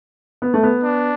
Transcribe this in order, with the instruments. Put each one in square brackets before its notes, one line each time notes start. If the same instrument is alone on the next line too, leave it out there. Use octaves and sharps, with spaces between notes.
[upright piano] B3
A3
B3
[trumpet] D4